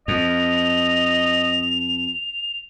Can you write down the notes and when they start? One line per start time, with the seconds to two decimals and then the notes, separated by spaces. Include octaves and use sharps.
0.08 F2 D#5 F7